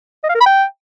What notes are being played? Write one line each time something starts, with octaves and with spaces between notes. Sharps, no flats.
D#5
F5
A#4
B5
G5